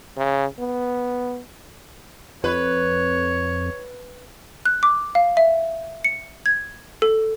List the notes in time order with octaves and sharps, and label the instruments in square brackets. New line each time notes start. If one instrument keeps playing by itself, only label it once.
[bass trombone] C#3
B3
[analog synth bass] F2 [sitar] B4 [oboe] C#5
[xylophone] F#6
D6
F5
E5
C#7
G#6
A4